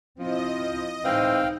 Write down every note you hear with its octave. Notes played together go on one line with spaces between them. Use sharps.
F3 C4 E4 D#5
A2 E3 G#3 C4 D#4 F5 G5